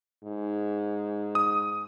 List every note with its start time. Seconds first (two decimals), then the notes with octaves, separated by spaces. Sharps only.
0.24 G#2
1.35 D#6